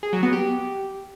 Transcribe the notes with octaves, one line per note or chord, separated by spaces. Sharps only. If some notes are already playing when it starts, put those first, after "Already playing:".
G#4
F#3
B3
G4